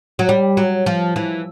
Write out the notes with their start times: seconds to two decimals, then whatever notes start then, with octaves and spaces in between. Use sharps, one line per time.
0.19 F#3
0.29 G3
0.57 F#3
0.86 F3
1.16 E3